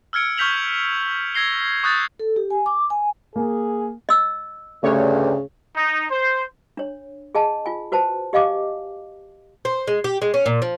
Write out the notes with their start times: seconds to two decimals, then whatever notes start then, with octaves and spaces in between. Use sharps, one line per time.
0.13 E6 F6 G#6 C#7 D7
0.38 C#6 F6 G6 B6 F7 F#7
1.34 E6 G#6 A#6 C7 G7
1.83 C#6 D#6 F#6 G6 A6
2.20 A4
2.36 G4
2.51 G#5
2.66 D6
2.90 G#5
3.36 A#3 G#4
4.09 D#5 E6
4.83 D2 G2 C#3 A3 C#5
5.77 D#4
6.11 C5
6.77 D4 C#5
7.35 G#4 D#5 G#5 A5
7.66 F4 G#5
7.92 F#4 B4 C5 A5
8.33 G4 D#5 F5 G#5 D6
9.65 C5
9.87 G#3
10.04 G4
10.22 G#3
10.34 C#4
10.46 A#2
10.62 F3